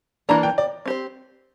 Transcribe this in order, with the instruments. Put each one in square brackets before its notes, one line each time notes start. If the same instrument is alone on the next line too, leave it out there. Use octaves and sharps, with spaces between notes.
[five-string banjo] E3 A#3 D4 [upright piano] A#5
[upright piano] G5
D5
[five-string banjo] C4 G4 C5